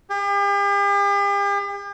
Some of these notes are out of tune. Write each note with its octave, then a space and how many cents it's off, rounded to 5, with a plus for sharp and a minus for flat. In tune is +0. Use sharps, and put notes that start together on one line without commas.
G4 +45